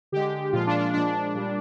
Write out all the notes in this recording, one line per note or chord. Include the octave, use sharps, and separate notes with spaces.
D3 G#3 G4
A#2 F3 G#3 F4
D4
D4
A#2 F3 G#3 D4
A#2 G3